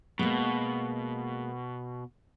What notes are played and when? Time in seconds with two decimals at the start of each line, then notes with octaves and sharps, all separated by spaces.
0.19 B2 G#3 A#3